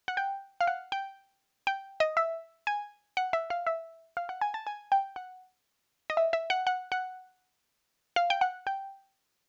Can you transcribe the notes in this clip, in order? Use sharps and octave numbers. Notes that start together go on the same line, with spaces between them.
F#5
G5
F5
F#5
G5
G5
D#5
E5
G#5
F#5
E5
F5
E5
F5
F#5
G#5
A5
G#5
G5
F#5
D#5
E5
E5
F#5
F#5
F#5
F5
G5
F#5
G5